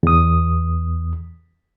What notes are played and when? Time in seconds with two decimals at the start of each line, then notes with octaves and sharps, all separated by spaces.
0.03 E2 D#6